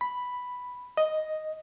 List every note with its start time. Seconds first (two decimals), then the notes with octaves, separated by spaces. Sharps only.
0.01 B5
0.97 D#5